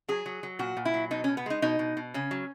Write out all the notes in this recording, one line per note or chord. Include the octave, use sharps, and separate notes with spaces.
F#3 G#4
F#3
F#3
A#2 F#4
A#2
E4
F#3
B2 D#4
C#4
B2
B3
G#3 D#4
B2 D#4
B2
B2
C#3 C#4
F#3